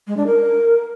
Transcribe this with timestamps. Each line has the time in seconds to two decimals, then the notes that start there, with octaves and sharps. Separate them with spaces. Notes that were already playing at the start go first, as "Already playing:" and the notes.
0.07 G#3
0.17 D4
0.26 A#4